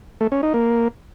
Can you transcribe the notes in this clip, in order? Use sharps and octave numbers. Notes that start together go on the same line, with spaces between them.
A3
C#4
D#4
A#3